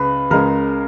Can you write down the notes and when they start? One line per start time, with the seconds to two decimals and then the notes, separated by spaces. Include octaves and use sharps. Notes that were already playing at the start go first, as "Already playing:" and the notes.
Already playing: C#2 C#3 B4
0.31 C#2 C#3 G#3 A#4